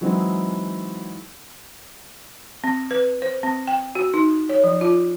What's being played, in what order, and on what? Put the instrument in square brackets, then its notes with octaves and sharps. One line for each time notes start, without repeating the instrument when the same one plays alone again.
[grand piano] E3 F#3 G#3 C4 D#4 E4
[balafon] C4
B4
C5
C4
G5
F#4
D#4
C#5
F3
F4